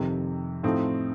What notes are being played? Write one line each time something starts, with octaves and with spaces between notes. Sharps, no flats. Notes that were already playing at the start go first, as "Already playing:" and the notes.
Already playing: F2 C3 D#3
A2 F3 A3 C4 D#4